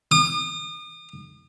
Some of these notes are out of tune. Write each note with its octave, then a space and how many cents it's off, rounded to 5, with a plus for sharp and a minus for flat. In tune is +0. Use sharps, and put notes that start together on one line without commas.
D#6 -40